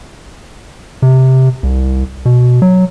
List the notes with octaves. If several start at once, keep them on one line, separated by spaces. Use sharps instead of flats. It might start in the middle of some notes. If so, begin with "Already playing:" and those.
C3
C2
B2
F#3